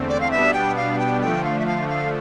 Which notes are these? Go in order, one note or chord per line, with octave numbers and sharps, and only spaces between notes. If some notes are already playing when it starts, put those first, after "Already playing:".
Already playing: E2 D3 A3 C4
D5
F5
B2 G3 B3 D4 E5
G5
F5
G5
D3 F3 A3 G5
F5
E5
F5
F5